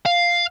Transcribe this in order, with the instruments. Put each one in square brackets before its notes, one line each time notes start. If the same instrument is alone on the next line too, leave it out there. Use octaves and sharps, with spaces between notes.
[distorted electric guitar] F5